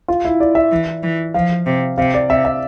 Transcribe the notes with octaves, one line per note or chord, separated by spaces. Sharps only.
F4
E4
D5
E5
E3
E3
F3 F5
C3
C3 F5
D5
C3 E5
E5